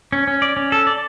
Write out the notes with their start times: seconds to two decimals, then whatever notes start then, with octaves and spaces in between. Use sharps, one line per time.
0.12 C#4
0.27 C#4
0.42 D5
0.57 C#4
0.72 A4
0.87 D5